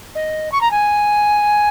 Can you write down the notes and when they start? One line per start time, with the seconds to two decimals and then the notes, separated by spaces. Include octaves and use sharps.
0.15 D#5
0.52 C#6
0.61 A#5
0.71 G#5